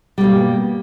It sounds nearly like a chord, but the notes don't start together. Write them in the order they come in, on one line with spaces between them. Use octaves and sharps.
G3 B2 A#3